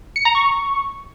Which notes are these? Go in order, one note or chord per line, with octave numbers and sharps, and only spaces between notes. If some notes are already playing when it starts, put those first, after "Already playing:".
C#7
A#5
C#6